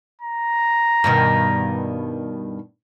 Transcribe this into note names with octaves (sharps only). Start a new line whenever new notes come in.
A#5
G2 B2 D#3